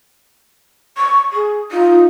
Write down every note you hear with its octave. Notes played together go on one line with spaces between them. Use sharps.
C#6
G#4
D#4 F4